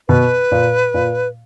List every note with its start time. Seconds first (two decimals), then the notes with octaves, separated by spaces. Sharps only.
0.08 B2 B4
0.52 A#2
0.94 A#2